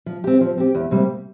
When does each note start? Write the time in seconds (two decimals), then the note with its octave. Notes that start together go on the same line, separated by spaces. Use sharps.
0.06 F3
0.24 C4 G4
0.41 F3
0.57 C4 G4
0.74 E2
0.91 C3 G3 A#3